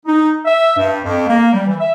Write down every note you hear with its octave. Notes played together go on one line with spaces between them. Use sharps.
D#4
E5
G2
F2
A#3
G3
E3
E5